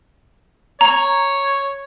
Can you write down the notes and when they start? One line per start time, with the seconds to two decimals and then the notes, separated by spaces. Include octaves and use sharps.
0.81 C#5 A#5